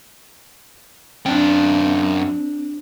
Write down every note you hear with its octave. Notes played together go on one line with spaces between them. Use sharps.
F#2 C4 D4 G5